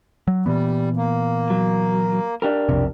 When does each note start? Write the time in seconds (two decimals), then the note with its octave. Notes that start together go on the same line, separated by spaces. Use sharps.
0.27 F#3
0.46 A#2 E3 G3 B3
0.97 A#3
1.50 F#3
2.42 D4 G4 A#4
2.69 B1 F2 C3